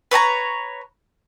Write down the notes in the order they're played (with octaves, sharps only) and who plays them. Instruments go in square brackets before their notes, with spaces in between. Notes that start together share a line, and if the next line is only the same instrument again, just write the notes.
[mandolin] B4 C#5 G#5 A#5